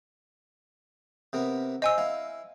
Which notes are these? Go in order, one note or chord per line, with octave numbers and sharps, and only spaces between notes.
C3 B3 A#4
C5 D#5 G#5 E6
E4 F5